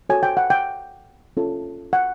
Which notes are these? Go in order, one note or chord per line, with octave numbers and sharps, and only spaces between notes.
F#4 A4 C#5 G#5
G5
F#5
G5
C#4 F4 A4
F#5